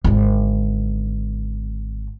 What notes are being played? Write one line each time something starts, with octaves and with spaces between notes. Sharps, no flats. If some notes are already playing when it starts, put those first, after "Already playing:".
G#1 D3